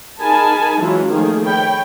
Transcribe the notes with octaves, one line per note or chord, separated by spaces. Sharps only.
D#4 G#4 A#4 G#5 A5 B5
E3 F#3 G#3 C#4 F4
D#3 F3 A3 A#3 G#4
C#5 G5 B5